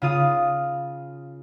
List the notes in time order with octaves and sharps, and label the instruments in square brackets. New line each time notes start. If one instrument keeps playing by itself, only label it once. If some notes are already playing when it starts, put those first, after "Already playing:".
[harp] C#3 F4 D#6